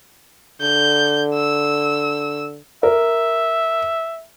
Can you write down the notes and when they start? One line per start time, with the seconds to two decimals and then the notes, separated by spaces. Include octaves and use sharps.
0.61 D3 G6
1.34 E6
2.83 A#4 E5